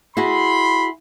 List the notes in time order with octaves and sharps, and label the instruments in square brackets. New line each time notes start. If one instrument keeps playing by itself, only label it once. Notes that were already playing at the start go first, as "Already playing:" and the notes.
[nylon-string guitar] E4 F#4 G#4 [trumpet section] B5 C6